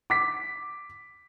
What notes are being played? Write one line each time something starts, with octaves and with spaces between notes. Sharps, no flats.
D6 B6